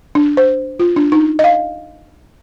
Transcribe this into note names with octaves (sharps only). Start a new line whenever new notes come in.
D4
C5
F4
D4
D#4
D#5
F5